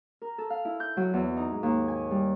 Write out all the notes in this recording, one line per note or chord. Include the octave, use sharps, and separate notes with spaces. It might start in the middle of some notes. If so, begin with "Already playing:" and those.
A#4
A4
F5
E4
G6
F#3
E2
D#4
G#2
D#2
G#5
G3